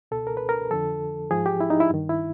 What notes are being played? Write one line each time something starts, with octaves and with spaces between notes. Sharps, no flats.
C#2 B2 A4
A#4
B4
A#4
F2 D3 F3 A4
G#2 F3 G#4
G4
E4
D#4
E4
G2 D#3
E4